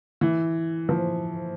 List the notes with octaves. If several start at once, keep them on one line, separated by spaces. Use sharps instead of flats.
E3
F3